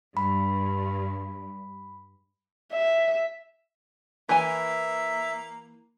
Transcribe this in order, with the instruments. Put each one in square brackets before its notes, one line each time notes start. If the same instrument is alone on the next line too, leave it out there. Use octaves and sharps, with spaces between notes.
[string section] G2 [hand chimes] B5
[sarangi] E5
[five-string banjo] E3 G#5 [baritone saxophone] A#3 [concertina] E5